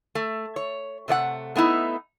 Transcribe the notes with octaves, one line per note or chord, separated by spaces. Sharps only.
A3
C#5
C3 A3 D5 F#5
A3 B3 D#4 E4